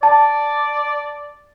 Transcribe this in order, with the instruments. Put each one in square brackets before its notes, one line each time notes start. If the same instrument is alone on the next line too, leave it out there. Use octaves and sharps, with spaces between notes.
[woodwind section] D5 [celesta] A5